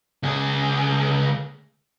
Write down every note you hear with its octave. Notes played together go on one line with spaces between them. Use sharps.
C#2 G#4